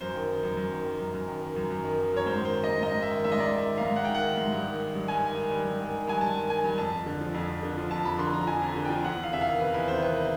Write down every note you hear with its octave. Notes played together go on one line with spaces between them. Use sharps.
F#2 C5
D#3
D#3
F#2
F#2
D#3
D#3
F#2
F#2
D#3
D#3
F#2
F#2
D#3
D#3
F#2 C#5
G#2 C5
D#3 C5
D#3
D#5
G#2
G#2 D#5
D#3 E5
D#3
G#2 E5
D#5
G#2 D5
D#3 E5
D#3
G#2 F5
G#2 F#5
G5
D#3 F#5
D#3
G#2
G2
D#3
D#3
G2
G2 G#5
D#3
D#3
G2
G2
D#3
D#3
G2 G#5
G2 A5
D#3
D#3 G#5
G2
F2 A5
F2
D3
F3
F2
F2
D3
F3
F2 A5
F2 B5
D3 C6
F3 A#5
F2 G#5
F2
D3
F3 G5
E2 F#5
E2
F5
C3 E5
D#3 F5
E2 B4
E2 B4
C3 C5
D#3 B4
B4